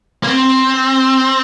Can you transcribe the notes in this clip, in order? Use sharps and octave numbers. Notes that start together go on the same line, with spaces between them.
A#3
C4